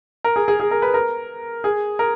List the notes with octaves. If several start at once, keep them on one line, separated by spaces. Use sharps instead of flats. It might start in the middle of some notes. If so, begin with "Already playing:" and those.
A#4
G#4
G#4
G#4
A#4
B4
A#4
G#4
A#4